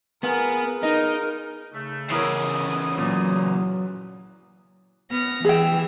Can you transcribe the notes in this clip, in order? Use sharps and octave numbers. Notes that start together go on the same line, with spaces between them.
B3 F4 G#4 A#4
D#4 A#4
C#3 A3
C#3 E3 B3 E4 A#4 C#5 D#6
A#2 F#3
B3 F6 A#6
E3 G#4 G5 E6